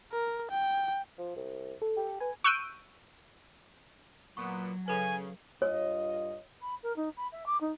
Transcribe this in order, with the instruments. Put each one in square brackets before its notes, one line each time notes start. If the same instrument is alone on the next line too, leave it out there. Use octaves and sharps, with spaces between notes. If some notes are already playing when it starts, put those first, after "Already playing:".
[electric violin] A#4
G5
[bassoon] F3
C2
[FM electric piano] A4
[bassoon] G4
[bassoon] B4 [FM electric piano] G#5
[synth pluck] C#6 E6 F#6 G6 D7 D#7
[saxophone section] A#2 B3 [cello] F#3 [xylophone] C#6
[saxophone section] C#3 [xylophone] A4 B4 [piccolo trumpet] G#5
[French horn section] G2 F4 D#5 [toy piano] C#5
[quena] B5
A#4
D#4
B5
E5
D6
D#4